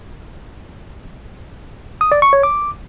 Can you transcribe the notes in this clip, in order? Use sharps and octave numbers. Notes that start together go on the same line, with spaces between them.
D#6
D5
C#6
C#5
D6